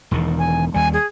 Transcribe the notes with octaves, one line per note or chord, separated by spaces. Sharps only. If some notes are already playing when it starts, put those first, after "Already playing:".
E1 E2 D#3
G#5
D#2 G3 G#5
G#4